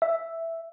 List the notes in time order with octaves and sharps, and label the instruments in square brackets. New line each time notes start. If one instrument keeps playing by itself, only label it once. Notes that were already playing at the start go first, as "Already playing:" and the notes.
[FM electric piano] E5